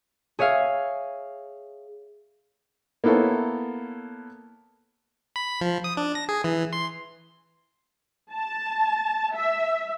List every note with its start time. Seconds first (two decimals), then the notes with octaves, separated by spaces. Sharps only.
0.39 G#4 C#5 E5 F5
3.04 A#3 B3 E4 A4 C#5
5.36 B5
5.61 F3
5.84 D#6
5.97 D4
6.15 A#6
6.29 G#4
6.44 E3
6.73 C6
8.31 A5
9.34 E5